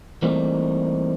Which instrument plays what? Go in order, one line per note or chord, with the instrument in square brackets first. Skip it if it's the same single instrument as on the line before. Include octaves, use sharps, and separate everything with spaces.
[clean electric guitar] E3 G3 A3 A#3 C4 D#4